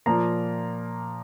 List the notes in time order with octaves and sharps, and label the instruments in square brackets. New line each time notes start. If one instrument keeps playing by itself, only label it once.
[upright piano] A#2 F3 A#3 A#5